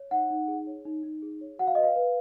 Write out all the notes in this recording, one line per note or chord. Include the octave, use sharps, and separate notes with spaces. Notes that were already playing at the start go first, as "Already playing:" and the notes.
Already playing: C#5
D#4 F#5
D#4
G#4
C#5
D#4
D#4
G#4
C#5
F#4 F#5
F5
B4 D#5
F5
B4